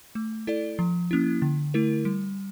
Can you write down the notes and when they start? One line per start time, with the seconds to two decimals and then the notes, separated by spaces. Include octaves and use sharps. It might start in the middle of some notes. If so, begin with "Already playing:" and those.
0.15 A3
0.47 E4 A4 D5
0.79 F3
1.11 A#3 C#4 E4
1.42 D3
1.74 A3 E4 A#4
2.05 G3